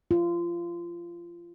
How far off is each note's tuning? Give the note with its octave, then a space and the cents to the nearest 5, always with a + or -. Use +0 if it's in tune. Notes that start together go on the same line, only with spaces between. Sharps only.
F4 -25